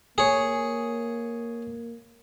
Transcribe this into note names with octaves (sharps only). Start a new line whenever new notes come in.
A#3 G#4 C#5